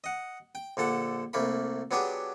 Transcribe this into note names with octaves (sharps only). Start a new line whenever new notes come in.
D#5 F#5
G5
A#1 D3 A4 F#5
C2 A3 A#3 B5
F#3 B3 D4 G4 G#4